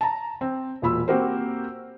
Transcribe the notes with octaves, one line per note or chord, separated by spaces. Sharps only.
A5 A#5
C4
E1 A#2 F4 B5 E6
A#3 C4 F#4 G4 A#4 C5